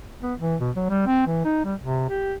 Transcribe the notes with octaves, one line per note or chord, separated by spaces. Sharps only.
B3
E3
B2
F#3
G3
C4
E3
D#4
G3
C3
G4